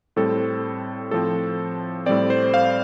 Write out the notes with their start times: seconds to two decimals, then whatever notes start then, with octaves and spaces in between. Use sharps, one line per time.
0.16 A2 G3 C4 A4
1.11 A2 F3 C4 A4
2.06 A2 G3 C4 D5
2.30 C5
2.54 F5